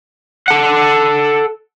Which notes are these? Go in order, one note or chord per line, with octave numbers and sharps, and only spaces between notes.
A4 F#5